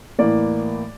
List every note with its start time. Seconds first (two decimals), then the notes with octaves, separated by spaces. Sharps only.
0.19 A2 E3 A#3 D5